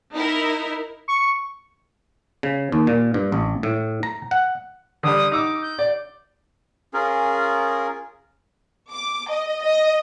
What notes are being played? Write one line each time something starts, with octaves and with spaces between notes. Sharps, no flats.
D#4 E4 A#4
C#6
C#3
D#2
A#2
G2
A1
A2
A#5
F#5
D3 G3 D#6
D#4 D6 E6
G6
D5
C#4 F4 G#4 A#4
D6
D#5
D#5